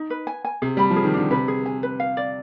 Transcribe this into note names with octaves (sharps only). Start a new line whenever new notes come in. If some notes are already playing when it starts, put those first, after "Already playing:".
Already playing: D#4
B4
G#5
G#5
C3 G#4
G3 B5
F3
G#4
D#3
D3 D4
C3 B4
G#4
G#5
B4
F5
D5